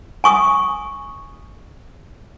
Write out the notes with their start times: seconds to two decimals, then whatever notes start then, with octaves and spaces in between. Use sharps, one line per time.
0.24 G#5 C#6 D#6